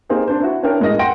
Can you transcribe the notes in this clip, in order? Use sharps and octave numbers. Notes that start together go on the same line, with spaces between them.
A#3 C4 D#4 G4 G#4
C4 D4 C5
E4 F#4
C#4 D4 E4 A#4 G5
A2 G#3 A#4 D#5 A#6
F#5 G5 C6 A#6 D7